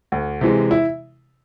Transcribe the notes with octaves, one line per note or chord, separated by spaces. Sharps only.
D2
C3 E3 G#3
E4